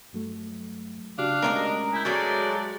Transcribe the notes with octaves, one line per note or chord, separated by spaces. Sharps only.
G2 F#3 A3
C#3 D4 F#4 G4 F5
G#3 A3 C#4 A#4 C#5 D#5
E4 G#5 G6
F#3 G#3 A3 A#4 D5